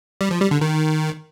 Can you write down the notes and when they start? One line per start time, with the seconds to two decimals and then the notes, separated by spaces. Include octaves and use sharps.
0.21 G3
0.31 F3
0.41 G3
0.51 D3
0.61 D#3